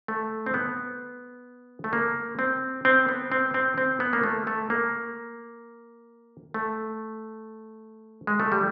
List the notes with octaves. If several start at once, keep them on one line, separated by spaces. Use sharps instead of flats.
A3
C4
B3
A3
A#3
C4
C4
B3
C4
C4
C4
B3
A#3
A3
A3
A#3
A3
G#3
A3
G3